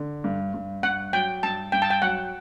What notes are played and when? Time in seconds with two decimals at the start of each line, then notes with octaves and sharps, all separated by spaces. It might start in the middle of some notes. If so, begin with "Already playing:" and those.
Already playing: D3
0.24 G2
0.54 G2
0.83 G2 F#5
1.13 F#3 G5
1.43 G2 A5
1.72 G2 G5
1.82 A5
1.90 G5
2.02 F#3 F#5